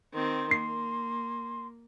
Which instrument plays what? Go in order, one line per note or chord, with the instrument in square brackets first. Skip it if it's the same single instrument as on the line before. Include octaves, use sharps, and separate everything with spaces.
[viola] D#3 C4 [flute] C6
[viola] A#3 [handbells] C7